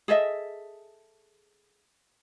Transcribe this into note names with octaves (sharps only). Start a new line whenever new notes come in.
G#4 A4 D#5 E5